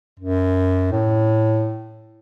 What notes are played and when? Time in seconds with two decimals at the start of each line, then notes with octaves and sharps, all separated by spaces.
0.19 F#2
0.92 A2